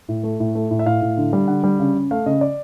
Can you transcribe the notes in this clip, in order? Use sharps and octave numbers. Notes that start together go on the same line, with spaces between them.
A2
A3
A2
A3
A2
E5
A2 F5
A2
D3
G3
D3 F#5
G3
C#3
C#3
A3 F5
C#3 D#5
D5